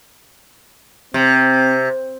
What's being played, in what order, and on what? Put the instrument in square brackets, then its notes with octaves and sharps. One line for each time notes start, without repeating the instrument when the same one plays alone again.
[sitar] C3 [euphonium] C4